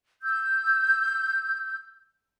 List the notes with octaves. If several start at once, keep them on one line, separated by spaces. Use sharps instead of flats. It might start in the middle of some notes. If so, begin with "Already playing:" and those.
E6 G6